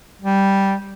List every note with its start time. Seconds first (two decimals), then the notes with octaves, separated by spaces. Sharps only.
0.22 G3